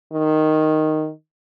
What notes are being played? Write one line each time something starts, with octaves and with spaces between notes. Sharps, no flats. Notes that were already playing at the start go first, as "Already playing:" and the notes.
D#3